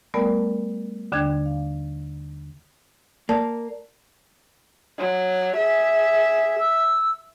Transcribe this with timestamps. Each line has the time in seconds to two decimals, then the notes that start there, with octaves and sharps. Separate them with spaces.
0.14 G3 A3 B3 A#4 D5
1.12 D#2 D3 D4 G5 F#6 G#6
1.46 F5
3.29 A#3 D5 A5
4.99 F#3
5.57 G#4 E5
6.59 E6